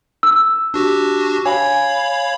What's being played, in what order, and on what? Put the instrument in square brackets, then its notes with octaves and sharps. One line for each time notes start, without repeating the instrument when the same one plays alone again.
[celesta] E6
[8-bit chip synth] D4 F#4 G4
[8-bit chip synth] C#5 F5 B5 [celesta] G#5